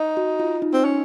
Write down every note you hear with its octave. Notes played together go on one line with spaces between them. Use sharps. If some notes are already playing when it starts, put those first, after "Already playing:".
Already playing: D#4
F#4
F4
D#4
C4
C#4